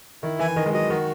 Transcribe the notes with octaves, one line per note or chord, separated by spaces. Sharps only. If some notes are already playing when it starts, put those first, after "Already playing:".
D#3 E4
E3 G#5
D#3 D#5
G#3
F#3 D#5
D#3 F#4